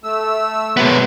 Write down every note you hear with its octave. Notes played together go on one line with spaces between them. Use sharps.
A3 E6
F#3 G#3 A#3 B3